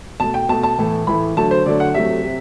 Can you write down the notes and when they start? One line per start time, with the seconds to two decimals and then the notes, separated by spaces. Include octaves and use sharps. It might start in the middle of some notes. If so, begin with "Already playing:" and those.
0.20 B2 A3 A5
0.34 G5
0.49 B2 A3 A5
0.63 A5
0.78 A2 E3 A3
1.07 A2 E3 A3 B5
1.37 D3 F#3 A3 A5
1.51 C5
1.66 D3 F#3 A3 D5
1.80 F#5
1.94 C3 F#3 A3 E5
2.24 C3